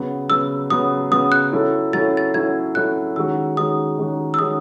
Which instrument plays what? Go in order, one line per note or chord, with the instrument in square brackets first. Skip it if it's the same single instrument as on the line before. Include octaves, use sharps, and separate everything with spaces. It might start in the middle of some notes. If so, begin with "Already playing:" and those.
Already playing: [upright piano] C#3 F#3 B3
[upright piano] C#3 F#3 B3 [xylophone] E6
[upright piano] C#3 F#3 B3 [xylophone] D#6
[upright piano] C#3 F#3 B3 [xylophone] D#6
[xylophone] F#6
[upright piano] F#3 C#4 E4 A4
[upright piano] F#3 C#4 E4 A4 [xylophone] A6
[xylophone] A6
[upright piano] F#3 C#4 E4 A4 [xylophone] G#6
[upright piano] F#3 C#4 E4 A4 [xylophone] F#6
[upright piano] D#3 G#3 C#4 F#4 [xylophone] E6
[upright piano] D#3 G#3 C#4 F#4 [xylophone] D#6
[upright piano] D#3 G#3 C#4 F#4
[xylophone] E6
[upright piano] D#3 G#3 C#4 F#4 [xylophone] D#6